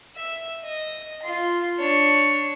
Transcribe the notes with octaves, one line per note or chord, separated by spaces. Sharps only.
E5
D#5
F4 C6
D4 C#5